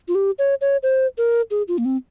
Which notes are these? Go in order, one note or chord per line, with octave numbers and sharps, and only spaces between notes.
F4
G4
C#5
C#5
C5
A#4
G#4
F4
A#3
C4